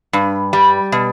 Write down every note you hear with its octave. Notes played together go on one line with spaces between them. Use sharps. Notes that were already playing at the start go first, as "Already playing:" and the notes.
G2
G3
B2